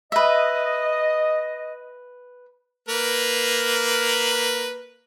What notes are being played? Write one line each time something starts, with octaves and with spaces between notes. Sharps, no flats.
B4 D#5 E5
A#3 A#4 B4